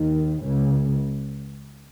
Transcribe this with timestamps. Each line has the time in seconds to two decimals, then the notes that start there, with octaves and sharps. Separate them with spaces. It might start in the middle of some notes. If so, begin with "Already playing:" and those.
Already playing: D#2 D#3
0.43 C#2 C#3